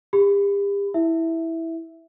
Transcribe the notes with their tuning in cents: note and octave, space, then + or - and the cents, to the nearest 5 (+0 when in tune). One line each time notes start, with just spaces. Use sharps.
G4 +40 B5 +30
E4 -10 E5 +0